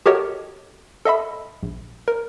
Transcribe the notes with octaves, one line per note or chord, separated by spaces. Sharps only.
F#4 G4 A4 A#4 C#5 D#5
A4 D#5 E5 B5
A#1
A#4